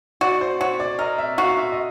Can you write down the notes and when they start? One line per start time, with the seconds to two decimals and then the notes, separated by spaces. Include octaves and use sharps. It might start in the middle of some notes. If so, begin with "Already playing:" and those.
0.21 F#4 D5
0.41 C5
0.60 F#4 C#5
0.80 D5
0.99 A#4 D#5
1.18 E5
1.38 F#4 F5
1.57 E5
1.72 D#5